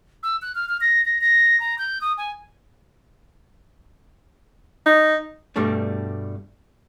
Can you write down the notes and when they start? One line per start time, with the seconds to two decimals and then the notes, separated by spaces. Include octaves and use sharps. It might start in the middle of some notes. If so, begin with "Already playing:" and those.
0.23 E6
0.42 F#6
0.55 F6
0.69 F6
0.81 A#6
1.05 A#6
1.21 A#6
1.60 A#5
1.78 G6
2.01 D#6
2.17 G#5
4.86 D#4
5.56 G2 B2 G3 A3 D4